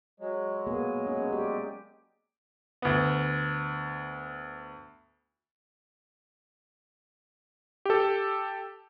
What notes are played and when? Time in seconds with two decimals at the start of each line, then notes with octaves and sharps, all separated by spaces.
0.20 F#3 G#3
0.67 A#3 B3 G#4
1.06 C#4 G#4
1.33 G4 D5
2.82 D2 B3
7.85 G4 A4